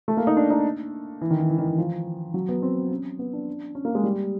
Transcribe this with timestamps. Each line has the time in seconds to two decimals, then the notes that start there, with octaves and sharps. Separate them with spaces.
0.08 A3
0.17 A#3
0.27 D#4
0.37 D4
0.50 D#4
1.21 E3
1.31 D#3
1.40 E3
1.50 E3
1.59 D#3
1.68 E3
1.78 F3
2.34 F#3
2.49 B3
2.62 C4
2.91 C#4
3.19 B3
3.33 D4
3.75 C#4
3.85 A#3
3.95 G#3
4.04 G3